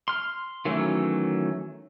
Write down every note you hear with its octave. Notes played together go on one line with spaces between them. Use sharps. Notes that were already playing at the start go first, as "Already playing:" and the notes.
C6 F6
D#3 E3 F#3 A3 C#4